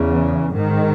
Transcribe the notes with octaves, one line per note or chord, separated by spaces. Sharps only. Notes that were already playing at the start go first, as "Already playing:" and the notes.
Already playing: E2 C#3
G#2 D#3